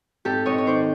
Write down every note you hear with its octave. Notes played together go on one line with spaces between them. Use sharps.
G#1 G4 A4
G#1 C#5 D#5
C#5
D#3 C5 D5